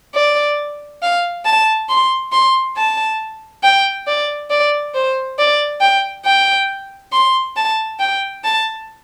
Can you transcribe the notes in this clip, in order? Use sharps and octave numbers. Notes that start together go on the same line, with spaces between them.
D5
F5
A5
C6
C6
A5
G5
D5
D5
C5
D5
G5
G5
C6
A5
G5
A5